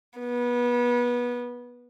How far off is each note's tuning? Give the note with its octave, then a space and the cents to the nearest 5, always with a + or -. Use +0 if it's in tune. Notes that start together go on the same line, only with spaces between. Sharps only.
B3 -25